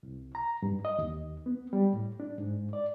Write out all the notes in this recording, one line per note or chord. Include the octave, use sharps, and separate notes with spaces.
C2
A#5
G2
D#5
D#2
B3
G3
A2
D4
G#2
D5